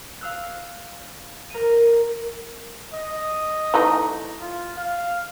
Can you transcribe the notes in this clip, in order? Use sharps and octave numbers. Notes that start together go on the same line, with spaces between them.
F5 E6 F#6
A#4 D#7
D#5
E3 A3 D#4
F4
F5